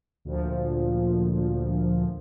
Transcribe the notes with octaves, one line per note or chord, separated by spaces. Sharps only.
D2 A#2 F3